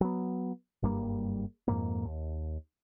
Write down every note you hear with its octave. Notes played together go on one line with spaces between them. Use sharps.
F#3 B3
F#1 G2 G3 A#3
F2 G#2 A#3
D#2